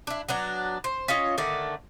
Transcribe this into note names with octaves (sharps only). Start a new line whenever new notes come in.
D4 E4
F#3 B3 D4
C5
C#4 F4 C#5 D#5
D3 D#3 A3 D5